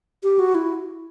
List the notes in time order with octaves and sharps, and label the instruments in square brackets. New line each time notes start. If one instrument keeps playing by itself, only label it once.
[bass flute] G4
F#4
E4